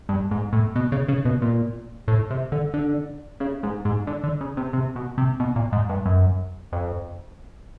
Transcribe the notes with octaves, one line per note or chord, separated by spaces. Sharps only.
G2
G#2
A2
B2
C#3
C#3
B2
A#2
A2
C3
D3
D3
C#3
G#2
G#2
D3
D3
C#3
C3
C3
B2
C3
B2
A#2
G#2
G2
F#2
F2